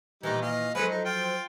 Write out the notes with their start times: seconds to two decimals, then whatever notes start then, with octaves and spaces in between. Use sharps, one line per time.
0.23 A#2 D#3 E3 G3 D#4
0.42 D#5 F5
0.75 F3 F#3 G#3 C#4 A4 B4
0.88 D#4
1.05 F4 G5